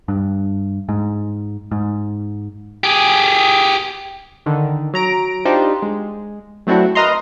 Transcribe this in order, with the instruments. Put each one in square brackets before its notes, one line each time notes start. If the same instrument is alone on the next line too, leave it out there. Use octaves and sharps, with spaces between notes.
[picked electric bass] G2
G#2
G#2
[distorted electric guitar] G4 G#4
[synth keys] D3 D#3
F#3 A#5 D7
D4 D#4 F4 G4 C5
G#3
F#3 A3 C4 D4 E4 F#4
A#4 B4 D#5 A#5 C6